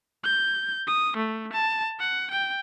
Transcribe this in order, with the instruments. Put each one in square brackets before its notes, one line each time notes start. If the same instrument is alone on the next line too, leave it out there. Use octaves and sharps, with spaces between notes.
[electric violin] G6
D#6
A3
A5
F#5
G5